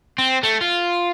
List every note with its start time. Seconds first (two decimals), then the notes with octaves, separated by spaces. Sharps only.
0.18 C4
0.43 A3
0.61 F4